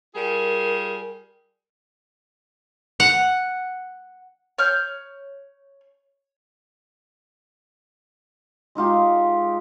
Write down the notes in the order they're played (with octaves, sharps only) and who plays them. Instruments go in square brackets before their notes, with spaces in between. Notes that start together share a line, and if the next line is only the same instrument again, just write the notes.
[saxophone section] G3 F4 G#4 [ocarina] A#4
[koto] F#5
[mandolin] C#5 F6 G6
[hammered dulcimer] G#3 D#4 F4 G4